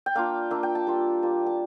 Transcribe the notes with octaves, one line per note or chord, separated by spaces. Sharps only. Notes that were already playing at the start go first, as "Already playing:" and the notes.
G5
A#3 D4 F4 F5
A#3 D4 F4 E5
G5
A5
G3 A#3 D4 F4
G3 A#3 D4 F4
A5